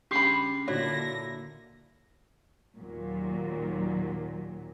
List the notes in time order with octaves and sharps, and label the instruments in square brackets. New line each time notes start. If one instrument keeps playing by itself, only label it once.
[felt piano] C#3 [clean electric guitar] G3 D4 C6 [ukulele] G4 B5
[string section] A#2 D3 A#6 [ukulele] D4 [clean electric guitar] E4 [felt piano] F#4 C#5
[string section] D#2 A#2 F#3